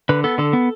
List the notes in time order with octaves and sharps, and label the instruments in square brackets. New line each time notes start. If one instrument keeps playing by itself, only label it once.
[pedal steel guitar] D3 B4
B3 A4
D3 A4
B3